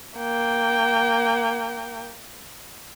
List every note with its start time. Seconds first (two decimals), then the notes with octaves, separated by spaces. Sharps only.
0.18 A#3 G5